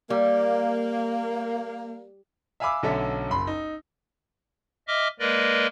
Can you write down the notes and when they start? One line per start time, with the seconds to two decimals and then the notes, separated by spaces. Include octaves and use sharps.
0.10 G3 A#3
2.60 E5 F5 G#5 B5 D6 E6
2.83 B1 D3 C#4 A4 E5
3.30 F#1 B5 C6
3.47 D#4
4.88 D#5 E5 D6 F6
5.19 G#3 A#3 A#4 B4 D5 D#5